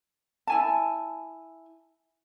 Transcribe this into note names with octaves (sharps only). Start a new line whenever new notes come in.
E4 G#5 A5